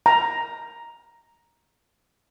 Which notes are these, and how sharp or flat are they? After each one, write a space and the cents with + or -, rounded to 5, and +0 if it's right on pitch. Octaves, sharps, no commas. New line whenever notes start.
A#5 +10